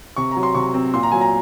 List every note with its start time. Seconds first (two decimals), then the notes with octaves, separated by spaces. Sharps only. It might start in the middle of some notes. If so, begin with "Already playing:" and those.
0.16 C3 C#6
0.31 A#5
0.37 F#3
0.43 C6
0.55 C3 C#6
0.74 C4
0.93 A#2 C6
1.03 A#5
1.11 F#3 G#5
1.21 A#5